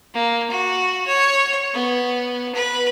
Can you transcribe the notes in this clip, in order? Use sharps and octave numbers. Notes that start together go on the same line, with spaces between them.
A#3
F#4
C#5
B3
B4